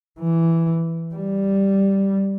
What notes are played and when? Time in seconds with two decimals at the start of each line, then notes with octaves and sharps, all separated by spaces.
0.20 E3
1.15 G3